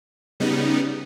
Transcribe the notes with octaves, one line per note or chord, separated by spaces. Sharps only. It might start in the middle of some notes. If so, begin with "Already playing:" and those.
C#3 G3 B3 D#4